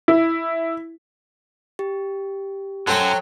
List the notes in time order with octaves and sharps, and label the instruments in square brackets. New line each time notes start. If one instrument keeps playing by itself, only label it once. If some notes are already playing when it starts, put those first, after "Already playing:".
[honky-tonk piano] E4
[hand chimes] G4
[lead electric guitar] F#2 [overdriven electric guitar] F#3 [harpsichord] A4 C5 G5